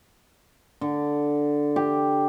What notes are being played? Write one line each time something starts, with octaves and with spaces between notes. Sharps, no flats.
D3
G4